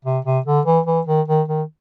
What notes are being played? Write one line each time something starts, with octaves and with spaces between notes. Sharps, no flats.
C3
C3
D3
E3
E3
D#3
D#3
D#3